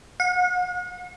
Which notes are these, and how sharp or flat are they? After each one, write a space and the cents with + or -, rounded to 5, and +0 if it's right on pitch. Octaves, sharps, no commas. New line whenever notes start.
F#5 -45